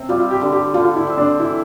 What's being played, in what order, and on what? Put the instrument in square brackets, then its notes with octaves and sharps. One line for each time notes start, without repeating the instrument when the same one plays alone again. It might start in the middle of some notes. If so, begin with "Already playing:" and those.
Already playing: [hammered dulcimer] C3 C4
[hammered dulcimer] G3 [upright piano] F4
[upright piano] G4
[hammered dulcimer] D3
[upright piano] G4
[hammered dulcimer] D3 [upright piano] F4
[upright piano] E4
[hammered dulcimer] C4
[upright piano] D4
[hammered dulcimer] E3 [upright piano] E4